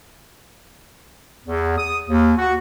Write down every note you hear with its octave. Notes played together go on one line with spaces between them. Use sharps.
E2
D#6
D#2
F#4